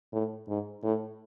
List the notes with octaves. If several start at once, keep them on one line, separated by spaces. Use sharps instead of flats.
A2
G#2
A2